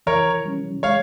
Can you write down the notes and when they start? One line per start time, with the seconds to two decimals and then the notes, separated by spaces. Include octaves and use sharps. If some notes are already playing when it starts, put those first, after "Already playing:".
0.07 E3 A#4 C#5
0.46 G3 C#4
0.83 G#3 C#5 F5